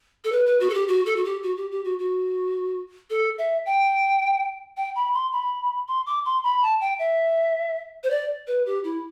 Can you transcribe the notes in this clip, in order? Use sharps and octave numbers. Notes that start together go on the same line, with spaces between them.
A4
B4
B4
F#4
A4
G4
F#4
A4
F#4
G4
F#4
G4
G4
F#4
F#4
A4
E5
G5
G5
B5
C6
B5
C6
D6
C6
B5
A5
G5
E5
C5
D5
B4
G4
E4